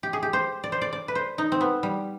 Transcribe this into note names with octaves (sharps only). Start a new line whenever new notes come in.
G4
G#4
G4
C5
D5
C5
D5
D5
B4
C5
D#4
C4
B3
G3